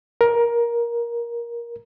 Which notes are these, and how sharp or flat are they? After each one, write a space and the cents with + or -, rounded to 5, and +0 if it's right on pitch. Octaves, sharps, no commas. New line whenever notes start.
A#4 +15